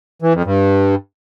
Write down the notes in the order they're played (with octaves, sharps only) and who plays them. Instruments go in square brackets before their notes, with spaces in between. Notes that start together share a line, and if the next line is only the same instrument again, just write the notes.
[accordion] E3
F2
G2